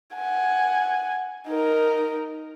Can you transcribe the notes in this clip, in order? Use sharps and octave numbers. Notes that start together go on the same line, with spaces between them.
F#5 G#5
D#4 A#4